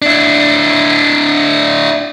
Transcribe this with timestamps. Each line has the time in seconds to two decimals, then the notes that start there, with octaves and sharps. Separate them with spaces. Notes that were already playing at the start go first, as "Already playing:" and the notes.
0.02 D4 E4